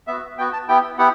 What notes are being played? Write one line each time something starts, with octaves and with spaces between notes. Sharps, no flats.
B3 F#4 E5
B3 F#4 G5
A5
B3 E4 G4 G5
B3 E4 G4 F#5